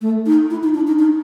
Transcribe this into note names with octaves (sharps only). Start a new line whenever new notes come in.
A3
D#4
E4
D#4
D4
D#4
D#4